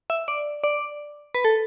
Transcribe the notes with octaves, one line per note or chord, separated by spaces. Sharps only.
E5
D5
D5
B4
A4